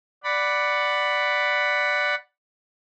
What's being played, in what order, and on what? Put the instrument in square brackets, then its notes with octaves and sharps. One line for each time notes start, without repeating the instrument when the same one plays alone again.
[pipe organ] D5 F#5 B5